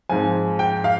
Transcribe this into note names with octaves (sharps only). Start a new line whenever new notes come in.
G#2 F3 C4 G#5
G5
F5